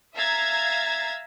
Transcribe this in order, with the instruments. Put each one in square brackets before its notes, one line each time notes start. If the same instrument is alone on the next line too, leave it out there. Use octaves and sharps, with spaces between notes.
[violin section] E5 F5 A#5 E6 G#6 A6